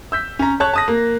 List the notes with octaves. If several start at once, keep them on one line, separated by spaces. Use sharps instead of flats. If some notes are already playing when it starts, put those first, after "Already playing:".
E6 G6 B6
C#4 A#5
C#5 A5 C#6 F#6
A5 D#6 A#6
A#3